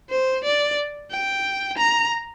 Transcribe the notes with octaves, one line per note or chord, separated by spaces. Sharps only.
C5
D5
G5
A#5